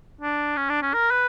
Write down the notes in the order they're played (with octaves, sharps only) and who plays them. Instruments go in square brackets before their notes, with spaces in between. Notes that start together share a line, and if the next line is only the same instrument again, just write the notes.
[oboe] D4
C#4
D4
C#4
A#4
B4